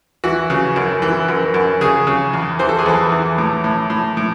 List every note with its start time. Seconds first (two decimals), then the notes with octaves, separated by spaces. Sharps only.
0.24 E3 F#4
0.50 C#3
0.76 F#2
1.02 E3
1.28 F#2
1.54 F#2
1.81 C#3 G#4
2.07 C#3
2.33 E2
2.59 E3 C5
2.69 A4
2.79 G#4
2.86 E2 A4
3.12 E3
3.38 A2
3.64 A2
3.90 A2
4.17 A2